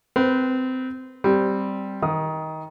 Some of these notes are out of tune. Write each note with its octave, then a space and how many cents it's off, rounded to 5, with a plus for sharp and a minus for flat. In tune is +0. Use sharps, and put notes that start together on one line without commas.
C4 -20 B4 -10
G3 +0 C4 +0
D#3 +20 D#6 +0